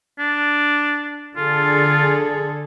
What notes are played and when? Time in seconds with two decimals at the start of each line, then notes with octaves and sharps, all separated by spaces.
0.19 D4
1.37 D3 F4 G#4 A4